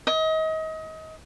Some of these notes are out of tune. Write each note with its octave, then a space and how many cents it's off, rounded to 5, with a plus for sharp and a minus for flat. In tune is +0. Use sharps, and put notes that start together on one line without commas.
D#5 +30